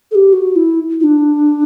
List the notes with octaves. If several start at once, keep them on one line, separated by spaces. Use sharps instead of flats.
A4
G4
F#4
E4
E4
D4